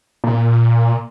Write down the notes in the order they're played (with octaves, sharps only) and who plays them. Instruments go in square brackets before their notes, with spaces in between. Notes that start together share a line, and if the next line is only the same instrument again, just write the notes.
[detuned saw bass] A#2